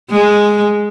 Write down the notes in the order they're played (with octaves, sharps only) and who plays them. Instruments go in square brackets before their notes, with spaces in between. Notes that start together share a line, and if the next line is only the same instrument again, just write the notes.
[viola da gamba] G#3